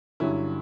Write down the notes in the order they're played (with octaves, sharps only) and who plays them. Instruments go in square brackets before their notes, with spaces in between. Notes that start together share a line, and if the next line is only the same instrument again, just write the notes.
[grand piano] G2 D3 F#3 [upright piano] C#4 E4